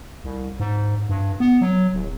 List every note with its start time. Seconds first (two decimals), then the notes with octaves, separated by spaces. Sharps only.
0.24 C2
0.60 G#2
1.09 G2
1.40 B3
1.61 F#3
1.94 D1